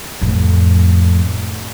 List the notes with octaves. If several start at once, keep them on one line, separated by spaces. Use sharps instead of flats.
F2 A2